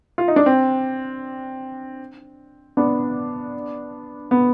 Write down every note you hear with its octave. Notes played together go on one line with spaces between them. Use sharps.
F4
D#4
D4
C4
B3 D4
B3